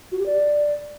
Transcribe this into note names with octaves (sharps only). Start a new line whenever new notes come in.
F#4
G4
D5